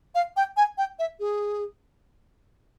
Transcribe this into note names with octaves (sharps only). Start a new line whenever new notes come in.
F5
G5
G#5
G5
E5
G#4